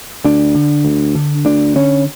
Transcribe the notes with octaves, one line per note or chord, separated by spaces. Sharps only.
D2 D4
D3
D2
D3
D2 D4
D3 C#4